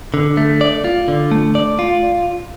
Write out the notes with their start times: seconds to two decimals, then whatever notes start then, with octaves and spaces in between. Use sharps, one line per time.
0.14 D3
0.37 A3
0.61 D5
0.84 F4
1.08 D3
1.31 A3
1.55 D5
1.79 F4